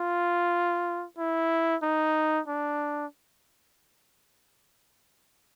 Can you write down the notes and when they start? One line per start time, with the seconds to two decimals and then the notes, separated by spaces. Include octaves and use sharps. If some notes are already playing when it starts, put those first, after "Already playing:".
Already playing: F4
1.18 E4
1.83 D#4
2.48 D4